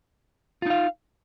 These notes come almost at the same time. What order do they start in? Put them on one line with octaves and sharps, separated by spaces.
F4 D#4 F5